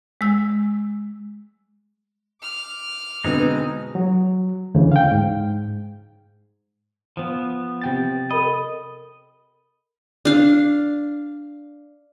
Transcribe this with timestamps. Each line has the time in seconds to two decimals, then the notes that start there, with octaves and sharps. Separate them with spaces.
0.21 G#3 E6
2.42 D6 F6
3.24 B2 D3 G#3 B3 C4 D#4
3.95 F#3
4.75 D2 C#3 E3
4.92 F5 G5
5.12 G#2
7.17 F3 B3
7.82 C3 G5 A6
8.31 A4 A#4 D#5 B5
10.25 D4 F5